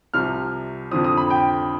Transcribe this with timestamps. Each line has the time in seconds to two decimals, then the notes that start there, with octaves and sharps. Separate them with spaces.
0.14 C2 C3 F3 F6
0.91 F2 D3 F3 C4 D#6
1.04 D#6
1.17 B5
1.30 G5